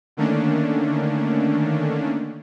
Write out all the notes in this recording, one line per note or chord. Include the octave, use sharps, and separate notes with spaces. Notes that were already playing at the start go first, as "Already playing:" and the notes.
D3 D#3 A3 A#3 C#4 D4